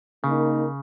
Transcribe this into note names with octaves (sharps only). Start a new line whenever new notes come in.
C#3 A#3 D#4 A#4